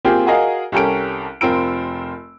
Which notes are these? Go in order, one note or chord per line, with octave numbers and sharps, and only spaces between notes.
A#3 C4 F4 G4 G#4
F#4 G#4 A#4 D#5 F5
C2 C#4 G4 A4 A#4 D7
F1 C4 F4 A#4 E6 D7